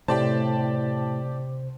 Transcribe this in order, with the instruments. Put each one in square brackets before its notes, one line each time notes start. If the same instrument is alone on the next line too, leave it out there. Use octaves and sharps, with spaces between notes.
[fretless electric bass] A2 [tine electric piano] C3 C5 [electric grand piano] G4 D5 A5